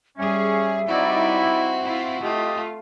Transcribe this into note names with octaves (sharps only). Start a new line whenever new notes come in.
G3 C#4 G#4 E5
G3 C4 D#4 E4 F#4 D5
E4 F4
A3 F4 G4 D#5